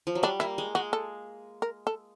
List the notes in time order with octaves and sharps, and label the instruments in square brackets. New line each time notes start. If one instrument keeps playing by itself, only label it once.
[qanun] F3
F#3
[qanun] G3 [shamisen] D4
[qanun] A#3 [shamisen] E4
[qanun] G#3
[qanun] G#3 [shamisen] F#4
[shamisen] A4
A#4
A4